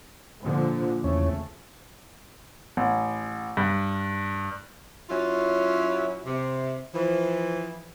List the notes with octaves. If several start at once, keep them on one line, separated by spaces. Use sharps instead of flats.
A#2 D3 F3
E2 C#3 A3 C#4
A1
G2
F#3 C#4 E4 F4
C3
E3 F3